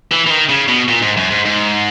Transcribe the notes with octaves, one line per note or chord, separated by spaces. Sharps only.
E3
E3
D#3
C#3
B2
A#2
G#2
F#2
G#2
G#2